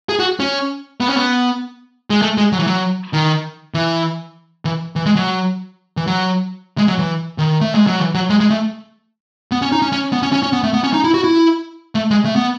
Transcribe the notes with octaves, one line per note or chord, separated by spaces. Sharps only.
G#4
F#4
C#4
B3
C#4
B3
G#3
A3
G#3
F#3
E3
F#3
D#3
E3
E3
E3
G#3
F#3
E3
F#3
G#3
F#3
E3
D#3
A3
G#3
F#3
E3
F#3
G#3
G#3
A3
B3
C#4
D#4
C#4
C#4
B3
C#4
C#4
C#4
B3
A3
B3
C#4
D#4
E4
F#4
E4
A3
G#3
A3
B3